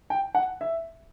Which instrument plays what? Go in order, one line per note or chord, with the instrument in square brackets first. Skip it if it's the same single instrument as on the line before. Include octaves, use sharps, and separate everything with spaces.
[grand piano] G5
F#5
E5